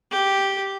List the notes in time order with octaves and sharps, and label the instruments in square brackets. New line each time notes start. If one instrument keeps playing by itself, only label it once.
[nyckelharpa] G4